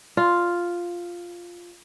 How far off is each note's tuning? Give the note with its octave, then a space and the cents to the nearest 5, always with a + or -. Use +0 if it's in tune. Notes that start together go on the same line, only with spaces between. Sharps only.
F4 +0